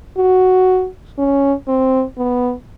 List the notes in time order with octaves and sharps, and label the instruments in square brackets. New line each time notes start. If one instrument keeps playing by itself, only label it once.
[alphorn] F#4
C#4
C4
B3